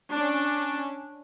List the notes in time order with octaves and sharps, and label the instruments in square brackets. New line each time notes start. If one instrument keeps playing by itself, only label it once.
[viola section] C#4 D4